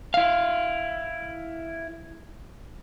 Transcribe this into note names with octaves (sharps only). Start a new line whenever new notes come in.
E4 F5